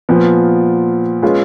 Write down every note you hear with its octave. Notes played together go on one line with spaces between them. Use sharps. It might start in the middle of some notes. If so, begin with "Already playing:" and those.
A#2 F3 B3 F4
G#3 C#4 F4 G#4 B4